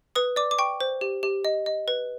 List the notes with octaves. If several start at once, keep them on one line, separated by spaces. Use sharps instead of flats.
B4 D#6
D5 D6
D6
G5 C#6
C5
G4
G4
D#5
D#5
B4